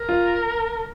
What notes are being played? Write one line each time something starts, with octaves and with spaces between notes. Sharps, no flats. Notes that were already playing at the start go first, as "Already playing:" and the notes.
Already playing: A#4
F4